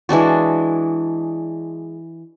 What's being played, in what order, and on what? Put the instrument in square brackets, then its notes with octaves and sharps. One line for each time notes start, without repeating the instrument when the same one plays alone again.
[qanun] E3 G#3 D4 F#4